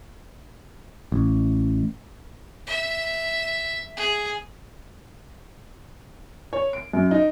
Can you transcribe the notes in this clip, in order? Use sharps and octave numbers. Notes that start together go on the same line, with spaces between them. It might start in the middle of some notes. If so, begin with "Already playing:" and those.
A1
E5
G#4
C#5
D7
F#2
D#4